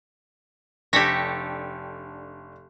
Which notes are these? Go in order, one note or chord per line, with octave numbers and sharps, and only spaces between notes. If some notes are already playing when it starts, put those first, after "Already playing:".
F1 D4 G4 A4 C#5 G5 A#6 B6